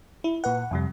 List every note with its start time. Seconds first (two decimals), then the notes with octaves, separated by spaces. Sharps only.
0.24 E4
0.44 A#2 B4 F#5
0.71 F2 C3 G3